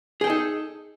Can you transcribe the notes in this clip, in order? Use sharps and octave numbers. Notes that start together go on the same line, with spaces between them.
D#4 G#4 A4 G5